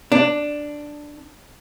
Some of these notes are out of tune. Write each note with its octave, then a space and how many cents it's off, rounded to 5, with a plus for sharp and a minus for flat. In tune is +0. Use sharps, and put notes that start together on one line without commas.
D4 +5